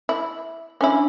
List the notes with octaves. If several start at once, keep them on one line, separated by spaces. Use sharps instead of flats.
E4
C#4 D4 E4 G#5